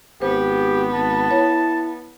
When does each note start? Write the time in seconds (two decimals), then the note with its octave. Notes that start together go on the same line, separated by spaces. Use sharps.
0.22 G#1 B3 G4 C5
0.92 G#1 A5
1.31 E4 C#5